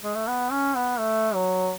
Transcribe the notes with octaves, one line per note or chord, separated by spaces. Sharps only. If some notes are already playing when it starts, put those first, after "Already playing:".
G#3
A3
B3
C#4
B3
A3
F#3